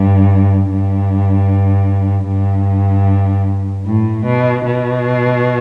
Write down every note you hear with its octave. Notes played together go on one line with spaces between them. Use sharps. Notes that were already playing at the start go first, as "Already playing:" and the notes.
Already playing: G2
G2
G2
A2
B2
B2